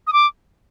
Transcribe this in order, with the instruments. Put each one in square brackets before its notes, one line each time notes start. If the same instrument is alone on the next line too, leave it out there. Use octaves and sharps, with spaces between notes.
[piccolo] D#6
D6